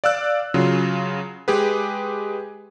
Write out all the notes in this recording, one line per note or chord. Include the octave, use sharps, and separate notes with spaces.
D5 F5 E6 F#6
C#3 F#3 F4
G#3 G4 G#4 B4